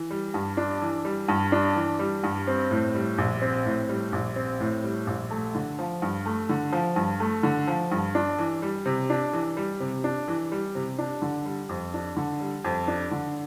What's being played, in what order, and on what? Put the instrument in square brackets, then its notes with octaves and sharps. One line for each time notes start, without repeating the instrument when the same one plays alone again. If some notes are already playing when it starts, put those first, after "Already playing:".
Already playing: [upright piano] E3
G3
G2
D4
E3
G3
G2
D4
E3
G3
G2
C4
A2
G3
A#1
C4
A2
G3
A#1
C4
A2
G3
A#1
A3
D3
F3
G2
A3
D3
F3
G2
A3
D3
F3
G2
D4
E3
G3
C3
D4
E3
G3
C3
D4
E3
G3
C3
D4
D3
G3
F2
D4
D3
G3
F2
D4
D3